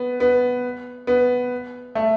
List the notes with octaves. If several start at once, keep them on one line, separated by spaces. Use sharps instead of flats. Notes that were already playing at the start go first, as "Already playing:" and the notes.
Already playing: B3
B3
B3
A3